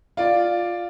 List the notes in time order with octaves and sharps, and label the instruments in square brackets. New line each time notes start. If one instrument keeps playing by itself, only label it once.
[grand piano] F4 D5